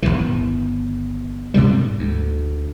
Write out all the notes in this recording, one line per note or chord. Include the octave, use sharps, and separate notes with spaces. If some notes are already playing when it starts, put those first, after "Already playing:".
G1 C#2 D#3 E3
G2 C3 D#3 G3
G#2
D2